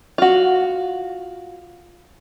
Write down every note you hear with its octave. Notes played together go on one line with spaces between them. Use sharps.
F4 F#4